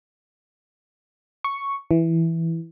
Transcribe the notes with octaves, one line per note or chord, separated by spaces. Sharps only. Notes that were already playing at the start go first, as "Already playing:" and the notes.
C#6
E3